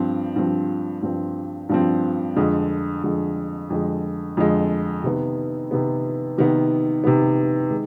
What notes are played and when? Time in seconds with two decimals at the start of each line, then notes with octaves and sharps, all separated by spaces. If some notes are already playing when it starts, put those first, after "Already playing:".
Already playing: G2 F3 C4
0.36 G2 F3 C4
1.02 G2 F3 C4
1.69 G2 F3 C4
2.36 F2 D3 G#3
3.04 F2 D3 G#3
3.70 F2 D3 G#3
4.37 F2 D3 G#3
5.03 C3 D#3 B3
5.71 C3 D#3 B3
6.38 C3 D#3 B3
7.04 C3 D#3 B3
7.71 D#3 G#3